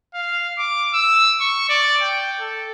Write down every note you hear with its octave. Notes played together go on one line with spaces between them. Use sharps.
F5
D6
E6
C#6
D5
G5
A4